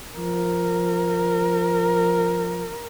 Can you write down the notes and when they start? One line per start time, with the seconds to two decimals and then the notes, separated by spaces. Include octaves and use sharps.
0.18 F3 A#4